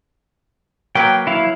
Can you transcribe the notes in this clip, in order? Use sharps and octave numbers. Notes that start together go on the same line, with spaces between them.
F#3 A#3 B4 G5
E4 F5